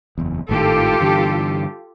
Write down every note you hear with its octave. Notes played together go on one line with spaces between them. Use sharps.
F#1 E2
G#1 A2 D#3 F4 G4 A4
G2 D3 E3